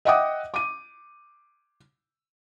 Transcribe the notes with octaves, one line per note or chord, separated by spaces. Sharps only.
D#5 E5 F#5 G5 D6 D#6
D6 D#7